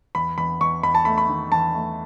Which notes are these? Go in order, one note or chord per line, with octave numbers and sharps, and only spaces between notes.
E2 B5
E2 B5
E2 C#6
E2 B5
A5
A3 B5
B5
D#3
E2 A5
A3